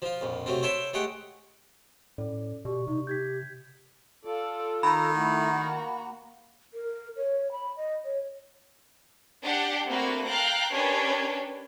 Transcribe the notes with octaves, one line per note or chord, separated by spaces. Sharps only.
F3 F4
A#1 F2
C3 F#3 A3 C4
C5 C#5 E5 G5 A5 B5
G#3 A3 G4 F#5 G5
A2 C#4 A4 D5
B2 G4 D5 C#6
C3 D#4
G4 G6 G#6 B6
F4 A4 D5
D#3 A#5 B5
A3 E4 F#4 A#5
A#3
A#4
C#5
B5
D#5
C#5
D4 G4 F#5
A3 A#3 C4 D4 F#4 B4
F5 G5 A5 A#5 F#6
C#4 D4 G4 A#4 B4 C#5